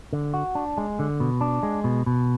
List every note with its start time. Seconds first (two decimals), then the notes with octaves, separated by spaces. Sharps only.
0.13 D3
0.34 F#4
0.55 D4
0.78 G#3
0.99 D3
1.20 B2
1.41 D4
1.63 G#3
1.84 B2
2.06 B2